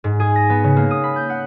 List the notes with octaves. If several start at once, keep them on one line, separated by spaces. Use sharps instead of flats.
G#2
G#4
A#6
B3
C#3
A#3
D#6
B5
G6
F#5